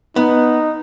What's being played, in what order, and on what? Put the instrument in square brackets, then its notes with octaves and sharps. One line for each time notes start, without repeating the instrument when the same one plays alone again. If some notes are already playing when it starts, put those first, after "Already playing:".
[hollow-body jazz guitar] B3 [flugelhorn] D#4